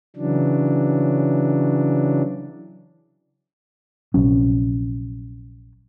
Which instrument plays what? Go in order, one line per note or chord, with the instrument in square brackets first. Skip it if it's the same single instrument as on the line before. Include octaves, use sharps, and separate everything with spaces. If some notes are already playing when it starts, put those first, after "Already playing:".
[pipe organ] C#3 E3 F#3 D4
[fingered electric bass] A#1 C3 F#3 C#4